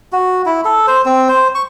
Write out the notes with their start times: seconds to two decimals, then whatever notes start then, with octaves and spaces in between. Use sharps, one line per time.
0.12 F#4
0.46 E4
0.65 A4
0.87 C5
1.05 C4
1.28 C5
1.55 C#6